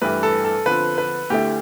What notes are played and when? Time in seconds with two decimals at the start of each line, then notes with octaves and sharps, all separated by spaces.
0.01 G2 E3 A3 E4 G4 B4
0.23 A4
0.45 A4
0.66 D3 F3 C4 F4 B4
0.98 B4
1.30 D2 D3 A3 E4 G4